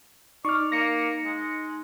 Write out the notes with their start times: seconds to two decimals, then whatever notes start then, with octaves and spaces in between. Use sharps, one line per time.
0.45 D#4 D5 C#6 F6
0.72 A#3 A#6 C#7
1.24 G#3